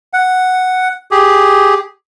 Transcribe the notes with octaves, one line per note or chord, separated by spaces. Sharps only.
F#5
G4 G#4